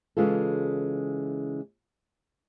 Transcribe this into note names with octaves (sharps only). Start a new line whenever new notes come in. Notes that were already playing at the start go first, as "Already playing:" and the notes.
C#3 E3 G#3 C#4 F4 A4